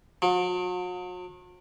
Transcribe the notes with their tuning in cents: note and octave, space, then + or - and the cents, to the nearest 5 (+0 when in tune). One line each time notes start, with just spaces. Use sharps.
F#3 -45